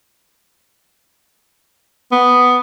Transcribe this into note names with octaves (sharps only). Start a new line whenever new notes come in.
B3